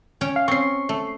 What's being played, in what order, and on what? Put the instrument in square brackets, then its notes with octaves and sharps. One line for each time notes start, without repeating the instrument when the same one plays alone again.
[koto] C#4 C#5 G5
[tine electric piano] F5
[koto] C4 C#4 [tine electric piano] C#6 C7
[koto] A3